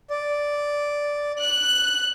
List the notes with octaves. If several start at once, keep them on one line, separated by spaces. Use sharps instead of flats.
D5
F#6